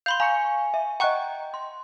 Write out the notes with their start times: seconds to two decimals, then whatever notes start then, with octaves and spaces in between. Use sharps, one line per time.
0.06 F5 B5 C6 G6 F7
0.20 F5 G#5 A#5 C#6 C#7
0.74 E5
1.00 D#5 F#5 G5 A#5 C#6 F#6
1.54 C6